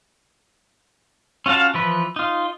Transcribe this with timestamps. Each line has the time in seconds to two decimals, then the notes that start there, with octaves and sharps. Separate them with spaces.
1.46 C#4 F4 F#4 F5 A5
1.74 E3 F3 B4
2.16 D#4 F4